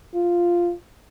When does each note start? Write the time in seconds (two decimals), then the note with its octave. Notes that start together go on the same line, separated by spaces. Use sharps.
0.15 F4